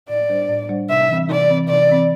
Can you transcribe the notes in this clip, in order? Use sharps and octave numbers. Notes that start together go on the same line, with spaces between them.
A2 D5
G3 D4 C5
A2
G3 D4 C5
C3 E5
E3 C4
C3 D5
E3 C4
C3 D5
E3 C4